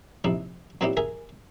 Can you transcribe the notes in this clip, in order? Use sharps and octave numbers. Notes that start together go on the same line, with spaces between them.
A#1 C3 D#4 E4
A#2 F#3 C4 D#4 E4 G4
G#4 A#4 E5 G#5